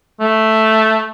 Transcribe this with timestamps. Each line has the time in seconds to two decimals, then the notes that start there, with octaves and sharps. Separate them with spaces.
0.20 A3